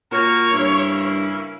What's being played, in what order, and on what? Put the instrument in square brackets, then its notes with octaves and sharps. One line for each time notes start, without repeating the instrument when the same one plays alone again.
[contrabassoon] A#2 [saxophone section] A#3 F#4 A#4 [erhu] C#5
[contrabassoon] G2 [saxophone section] C#3 A#3 E4